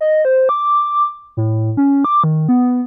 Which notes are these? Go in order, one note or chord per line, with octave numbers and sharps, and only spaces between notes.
D#5
C5
D6
A2
C#4
D6
D#3
B3